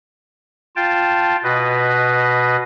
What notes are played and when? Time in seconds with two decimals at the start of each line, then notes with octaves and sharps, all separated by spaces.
0.76 F4 G5 A5
1.44 B2 B4 D#5